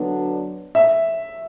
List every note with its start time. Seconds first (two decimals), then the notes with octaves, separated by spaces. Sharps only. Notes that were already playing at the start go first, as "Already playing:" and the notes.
Already playing: D3 F#3 B3 D4
0.75 E5